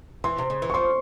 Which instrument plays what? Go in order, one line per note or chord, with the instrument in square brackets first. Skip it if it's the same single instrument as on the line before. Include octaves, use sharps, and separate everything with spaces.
[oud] E3 [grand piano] C6
[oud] C3
C#3
E3
[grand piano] C#6
[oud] F3 [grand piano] C6